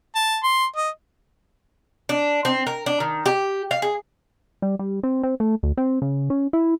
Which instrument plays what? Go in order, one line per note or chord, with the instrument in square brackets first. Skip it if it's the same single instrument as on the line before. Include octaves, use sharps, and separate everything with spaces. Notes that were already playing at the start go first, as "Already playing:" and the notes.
[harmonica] A5
C6
D#5
[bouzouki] D4
C4
A#4
D4
D#3
G4
F5
G#4
[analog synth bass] G3
G3
C4
C4
A3
D2
C4
C#3
C#4
E4